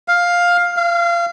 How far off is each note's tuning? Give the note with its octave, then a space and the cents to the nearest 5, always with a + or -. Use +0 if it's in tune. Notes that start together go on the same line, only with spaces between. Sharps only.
F5 +10
F5 -25